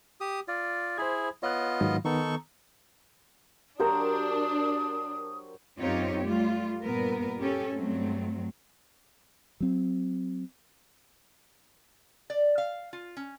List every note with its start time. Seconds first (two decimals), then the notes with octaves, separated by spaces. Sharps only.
0.21 G4 D#6
0.48 F4 D5
0.98 E4 G#4 C5 B5 G#6
1.43 B3 F4 C#5 D#5 F#6
1.81 G#2 D#3 F#3
2.05 D#3 B3 D#4 A4 C#6
3.80 F#3 D4 G4 A#4 C5 A#5 D#6
5.79 F#2 C4 D#4 F4 G4 C#5
6.26 G3 A3 F4
6.81 G2 A#2 B3 A#4 B4
7.39 C#4 G4 A4
7.74 G2 F#3 A3 C4
9.60 F#3 C4
12.30 D5
12.58 F5
12.93 F4
13.17 C#4